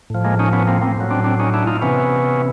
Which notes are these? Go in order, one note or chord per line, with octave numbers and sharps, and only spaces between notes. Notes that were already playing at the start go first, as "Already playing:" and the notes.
A2 F3
G#3 A#3
C#4 D#4
B3 C#4
A#3 C4
A#3 C4
A2 F#3
C4 D4
C4 D4
C#4 D#4
D4 E4
D#4 F4
C3 E3 B3 C#4